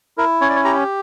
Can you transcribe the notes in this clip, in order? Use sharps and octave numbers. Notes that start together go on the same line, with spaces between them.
E4 A#4
C#4 C#5
D5
C#5
G4 A#5